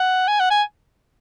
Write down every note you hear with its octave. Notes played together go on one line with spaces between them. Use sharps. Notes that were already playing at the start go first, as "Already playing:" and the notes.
Already playing: F#5
G#5
F#5
G#5